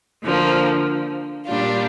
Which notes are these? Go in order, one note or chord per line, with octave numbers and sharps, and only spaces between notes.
D3 F3 A#3
A#2 G3 D4 F4